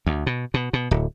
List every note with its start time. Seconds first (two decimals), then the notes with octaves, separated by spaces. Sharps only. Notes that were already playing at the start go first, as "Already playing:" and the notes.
0.06 D2
0.27 B2
0.54 B2
0.73 B2
0.91 D1